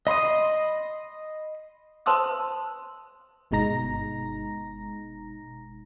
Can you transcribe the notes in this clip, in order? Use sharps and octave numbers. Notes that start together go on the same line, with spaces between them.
D#5 B5 C6 D#6
B4 C5 A5 C6 D#6 E6
G1 B2 G#3 D#4 A#5 A#6